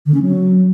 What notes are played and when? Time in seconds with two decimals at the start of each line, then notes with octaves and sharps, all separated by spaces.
0.06 D3
0.14 C#4
0.22 F#3